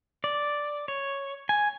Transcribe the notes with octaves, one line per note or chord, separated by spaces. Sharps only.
D5
C#5
G#5